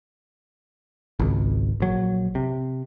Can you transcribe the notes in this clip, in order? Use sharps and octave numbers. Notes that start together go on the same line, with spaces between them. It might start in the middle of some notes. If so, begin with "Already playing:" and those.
G#1 C#2
A#1 F#3
C3